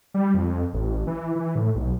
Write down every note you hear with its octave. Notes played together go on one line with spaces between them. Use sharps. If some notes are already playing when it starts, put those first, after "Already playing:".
G3
F2
A1
E3
E3
A2
B1